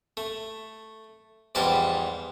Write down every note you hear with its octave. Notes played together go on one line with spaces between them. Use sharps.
A3
E2 G#2 F3 G3 E4 A5